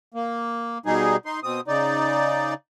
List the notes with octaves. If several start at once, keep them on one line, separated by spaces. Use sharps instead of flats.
A#3
B2 G3 D#4 G#4
D#4 C6
B2 C4 D#6
C#3 D#4 D5